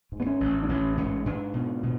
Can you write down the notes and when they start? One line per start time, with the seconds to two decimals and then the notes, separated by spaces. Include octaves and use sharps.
0.12 G#2
0.20 B3
0.26 C#4
0.40 A1
0.63 D4
0.69 A1 C#4
0.97 G#2 C#4
1.26 G#2 D4
1.54 B2
1.83 B2